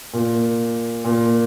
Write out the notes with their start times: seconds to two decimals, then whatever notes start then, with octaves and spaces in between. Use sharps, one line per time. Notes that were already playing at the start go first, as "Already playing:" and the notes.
0.13 A#2
1.04 A#2